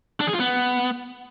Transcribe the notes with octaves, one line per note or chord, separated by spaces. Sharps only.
D4
G#4
F4
B3